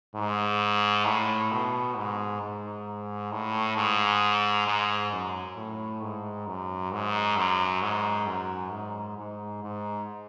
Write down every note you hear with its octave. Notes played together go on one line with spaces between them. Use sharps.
G#2
A2
B2
G#2
G#2
A2
G#2
G#2
F#2
A2
G#2
F#2
G#2
F#2
G#2
F#2
G#2
G#2
G#2